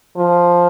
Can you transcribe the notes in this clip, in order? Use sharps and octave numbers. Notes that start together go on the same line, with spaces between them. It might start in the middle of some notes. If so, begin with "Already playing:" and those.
F3